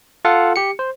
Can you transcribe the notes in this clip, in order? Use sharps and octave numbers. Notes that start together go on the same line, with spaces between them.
F4 A4 F5 F#5
G4 C#7
C5